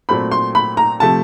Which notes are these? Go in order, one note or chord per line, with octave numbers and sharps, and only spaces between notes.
A#2 F#3 A3 C4 B5
C6
B5
A#5
C3 F3 A3 A5